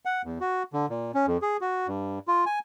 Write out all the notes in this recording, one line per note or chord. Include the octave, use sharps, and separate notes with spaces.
F#5
E2
F#4
D3
A#2
C#4
F2
G#4
F#4
G2
F4
G#5